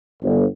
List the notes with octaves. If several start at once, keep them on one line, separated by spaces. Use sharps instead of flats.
G1